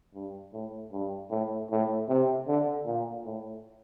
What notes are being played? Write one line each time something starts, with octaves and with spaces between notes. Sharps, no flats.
G2
A2
G2
A2
A2
C3
D3
A#2
A2